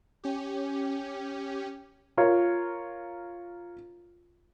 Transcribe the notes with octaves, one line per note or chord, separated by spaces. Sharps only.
C#4 G4
F4 A#4 C#5